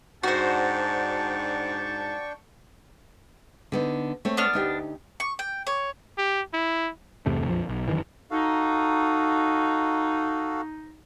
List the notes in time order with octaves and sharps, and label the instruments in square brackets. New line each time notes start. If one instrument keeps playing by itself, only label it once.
[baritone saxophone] G#2 [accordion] D4 G5 C#6 [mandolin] F#4 C5 [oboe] A5
[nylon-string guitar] D3 B3 D#4
A3 C4 C#5
[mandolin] B3 D4 F6
[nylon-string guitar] D2 D#4 G4
[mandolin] C#6
G5
C#5
[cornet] G4
E4
[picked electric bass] G1 E2 C3 A3
A#1 F2 F3
B1
G1 F#2 D#3 E3
[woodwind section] D#4 [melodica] F#4 A4 F5